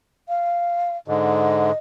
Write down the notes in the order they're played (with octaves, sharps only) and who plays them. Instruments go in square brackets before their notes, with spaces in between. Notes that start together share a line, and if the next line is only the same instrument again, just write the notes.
[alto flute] F5
[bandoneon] G#2 D3 [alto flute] D#5